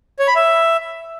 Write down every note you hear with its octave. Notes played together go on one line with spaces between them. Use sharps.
C#5
B5
E5